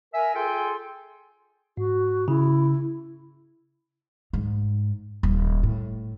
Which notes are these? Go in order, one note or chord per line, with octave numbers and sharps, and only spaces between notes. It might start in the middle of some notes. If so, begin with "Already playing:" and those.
A#4 E5 G#5
F4 G#4 A4 G5 G#5 C6
G#2 F#4
C#3 E4
G#2
D#1
A2